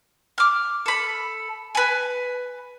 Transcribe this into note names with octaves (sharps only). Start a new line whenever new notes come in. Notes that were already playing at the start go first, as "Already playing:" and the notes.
D6 F6
A4 B5
B4 G#5